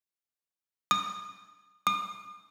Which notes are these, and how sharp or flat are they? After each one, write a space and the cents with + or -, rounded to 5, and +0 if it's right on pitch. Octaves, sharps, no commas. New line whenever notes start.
D#6 -30
D#6 -45